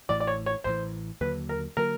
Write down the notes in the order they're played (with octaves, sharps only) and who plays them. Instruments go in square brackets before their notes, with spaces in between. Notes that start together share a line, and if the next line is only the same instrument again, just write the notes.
[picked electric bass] A1 A2 E3 [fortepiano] D5
[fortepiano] D5
C#5
C#5
[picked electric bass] A1 A2 E3 [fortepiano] C5
[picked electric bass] D#2 D3 F#3 A#3 [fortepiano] B4
[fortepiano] A#4
[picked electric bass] D3 F#3 A#3 [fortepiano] A#4